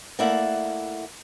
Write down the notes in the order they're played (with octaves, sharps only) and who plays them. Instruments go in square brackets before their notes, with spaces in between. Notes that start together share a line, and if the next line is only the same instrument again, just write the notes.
[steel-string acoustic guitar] A3 A#3 E4 D5 E5 F#5